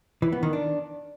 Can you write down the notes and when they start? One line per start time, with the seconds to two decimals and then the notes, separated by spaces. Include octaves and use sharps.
0.22 E3
0.32 B3
0.43 D#3
0.53 D4